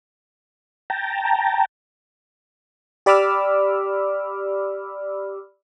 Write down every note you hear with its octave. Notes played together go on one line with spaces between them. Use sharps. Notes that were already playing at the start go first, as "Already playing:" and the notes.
G5 A5 A#5
G4 D5 B5 D6 E6 F6